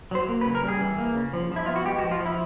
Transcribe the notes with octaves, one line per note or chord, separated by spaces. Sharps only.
F#3 C5
A#3
B4
C#3
A#4
G3
G#4
E3
A#3
C#3
F3
F3 E4
B3 F4
F#4
G#3 G4
F#4
F3
F4
F3
E4